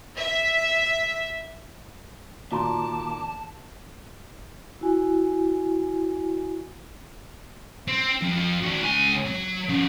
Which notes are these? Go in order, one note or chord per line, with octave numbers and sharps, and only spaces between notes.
E5
A#2 D#3 A#3 F#4 A5 A#5 C6 D6
E4 F#4 G#5
C4
F2
D#3 F#4
C#2 G#5
F#3
F3 C#4